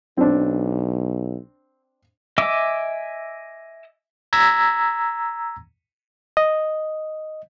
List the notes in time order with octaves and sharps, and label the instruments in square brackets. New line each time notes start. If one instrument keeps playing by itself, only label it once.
[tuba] B1 [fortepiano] C4 D4
[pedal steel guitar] D#5 E5 G#5 D6 E6
[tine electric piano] A#5 E6 G#6 A#6 B6
[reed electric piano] D#5